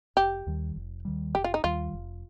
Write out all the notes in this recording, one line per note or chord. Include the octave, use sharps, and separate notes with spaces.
F1 G4
D#2 D#3 G3
F1
D#2 D#3 G3
F1 G4
F4
D#4
D#2 D#3 G3 F4
F1